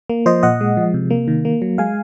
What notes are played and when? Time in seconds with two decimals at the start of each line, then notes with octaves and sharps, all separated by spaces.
0.10 A#3
0.26 F3 C5 D#5
0.43 A#2 D#5 F#5
0.61 G#3
0.77 F3
0.94 C3
1.10 A#3
1.28 D#3
1.45 A#3
1.62 F#3
1.78 G#3 F5 G#5